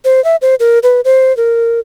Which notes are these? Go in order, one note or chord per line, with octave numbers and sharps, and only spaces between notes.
C5
E5
C5
A#4
B4
C5
A#4